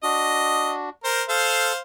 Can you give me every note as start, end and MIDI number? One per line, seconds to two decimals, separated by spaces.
0.03 0.90 62
0.03 0.90 66
0.03 0.73 75
1.04 1.23 70
1.04 1.23 72
1.29 1.73 69
1.29 1.80 72
1.29 1.80 77